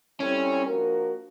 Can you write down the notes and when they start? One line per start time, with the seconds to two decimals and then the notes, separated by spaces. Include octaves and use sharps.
0.20 G3 C4 C#4 E4 A4 C#5
0.66 F3 A#3 D4 F#4 A#4